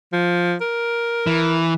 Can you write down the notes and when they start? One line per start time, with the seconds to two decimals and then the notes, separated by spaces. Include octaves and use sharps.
0.13 F3
0.61 A#4
1.27 E3